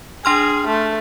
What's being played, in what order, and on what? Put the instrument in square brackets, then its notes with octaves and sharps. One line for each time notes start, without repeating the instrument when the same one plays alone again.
[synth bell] D4 C6 F6 [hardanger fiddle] G#4
[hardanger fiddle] A3